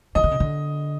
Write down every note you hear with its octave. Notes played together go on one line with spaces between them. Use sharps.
D#3 D#5
D3
C#3
D3